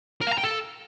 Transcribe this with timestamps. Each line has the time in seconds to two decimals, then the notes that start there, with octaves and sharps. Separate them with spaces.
0.21 A#4
0.27 F5
0.33 A#5
0.38 G5
0.44 A4